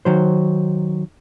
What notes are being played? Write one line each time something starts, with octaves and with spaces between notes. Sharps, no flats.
D#3 F#3 C5